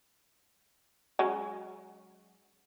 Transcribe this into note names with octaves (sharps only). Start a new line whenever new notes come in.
F#3 G#3 C#4